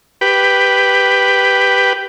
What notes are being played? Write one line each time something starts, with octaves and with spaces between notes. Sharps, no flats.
G4 B4